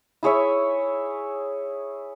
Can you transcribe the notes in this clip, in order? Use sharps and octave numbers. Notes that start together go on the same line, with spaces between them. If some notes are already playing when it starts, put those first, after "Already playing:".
E4 G#4 C#5 E5